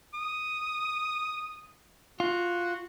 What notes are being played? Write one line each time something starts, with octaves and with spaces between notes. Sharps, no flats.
D#6
F4 F#4